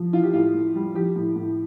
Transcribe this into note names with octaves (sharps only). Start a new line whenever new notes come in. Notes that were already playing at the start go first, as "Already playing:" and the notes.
Already playing: F3
E3 F4
G4
A2 F4
A2
G3
F3 G4
A2
A2